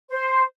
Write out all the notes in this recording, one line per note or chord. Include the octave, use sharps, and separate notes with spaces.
C5